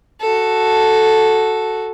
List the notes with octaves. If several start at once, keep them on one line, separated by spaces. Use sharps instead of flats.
F#4 A4